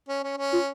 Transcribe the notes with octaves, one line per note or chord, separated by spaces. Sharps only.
C#4
C#4
C#4
F4